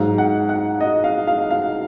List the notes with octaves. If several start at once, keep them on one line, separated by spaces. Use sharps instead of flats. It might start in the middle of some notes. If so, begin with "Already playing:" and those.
Already playing: G#2 F#3 F5
F#5
F#5
D#5
F5
F5
F5